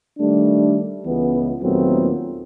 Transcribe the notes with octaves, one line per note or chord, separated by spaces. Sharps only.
D#3 G3 A3 D4
C#2 E3 B3
D#2 A#2 F#3 A3 B3 C4